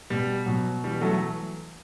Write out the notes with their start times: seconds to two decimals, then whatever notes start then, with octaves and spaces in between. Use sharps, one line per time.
0.10 B2 G3
0.46 B2 F#3
0.84 E3 G3
1.01 F#3 A3